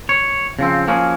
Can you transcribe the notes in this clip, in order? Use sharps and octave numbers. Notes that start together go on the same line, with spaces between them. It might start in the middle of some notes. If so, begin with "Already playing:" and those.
C#5
C#3 F3 C4
F3 A#3 C#4 F#4 G#4